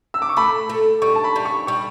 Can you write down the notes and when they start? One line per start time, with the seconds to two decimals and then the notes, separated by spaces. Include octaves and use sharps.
0.14 E6
0.22 D6
0.29 C#6
0.37 A3 B5
0.69 A3
1.02 G3 C#6
1.15 A5
1.24 B5
1.36 G3
1.45 C#6
1.67 G3 C#6